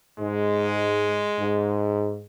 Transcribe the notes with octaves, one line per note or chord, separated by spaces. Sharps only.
G#2 G#3
G#2